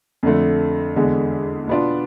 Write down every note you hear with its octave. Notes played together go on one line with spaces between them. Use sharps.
F2 D3 A3
E2 D3 G#3
B2 B3 D4 F4